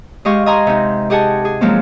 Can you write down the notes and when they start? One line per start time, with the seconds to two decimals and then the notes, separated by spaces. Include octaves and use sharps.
0.25 G#3 G4 D#5 F5 C#6
0.46 D#5 G#5 A#5 C6 D#6
0.67 C3 D#4
1.10 G4 G#4 D#5 F#5 G#5 A5
1.45 G#4
1.61 F3 F#3 G#3 A#3 C4 C#4